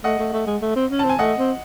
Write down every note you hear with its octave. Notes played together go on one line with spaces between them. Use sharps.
A3 D#5 F#5
A3
A3
G#3
A3
C4
C#4
A5
C4
G#5
A3 D#5 F#5
C4